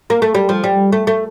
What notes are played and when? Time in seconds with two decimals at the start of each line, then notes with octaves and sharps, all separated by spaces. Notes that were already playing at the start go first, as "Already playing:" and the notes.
0.10 A#3
0.22 A3
0.34 G3
0.49 F3
0.64 G3
0.92 A3
1.07 A3